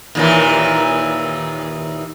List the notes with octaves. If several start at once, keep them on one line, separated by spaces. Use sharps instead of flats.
D#2 A#2 E3